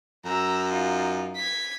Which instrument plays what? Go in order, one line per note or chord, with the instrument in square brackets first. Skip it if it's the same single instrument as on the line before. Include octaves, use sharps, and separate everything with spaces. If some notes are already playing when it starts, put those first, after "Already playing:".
[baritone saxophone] F#2 [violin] A#5 E6
[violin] D#4 F4
G#6 B6